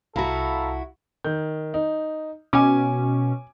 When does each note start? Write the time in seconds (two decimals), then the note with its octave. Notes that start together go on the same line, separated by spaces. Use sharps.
0.16 C2 E4 F#4 A4 F5 A#5 B5
1.24 D#3 G6
1.74 D#4
2.53 B2 C#4 G#5 D6